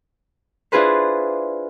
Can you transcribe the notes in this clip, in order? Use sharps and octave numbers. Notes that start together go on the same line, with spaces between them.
D4 E4 F4 G#4 B4 C5